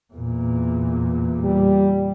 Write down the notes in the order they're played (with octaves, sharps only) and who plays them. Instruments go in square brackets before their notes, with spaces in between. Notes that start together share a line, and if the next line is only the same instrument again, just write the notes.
[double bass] E2 A#2
[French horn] G3